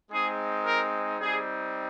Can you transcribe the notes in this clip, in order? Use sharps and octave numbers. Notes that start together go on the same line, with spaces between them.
G#3 C4 D#4 G#4
A#4
G3 C4 D#4 G#4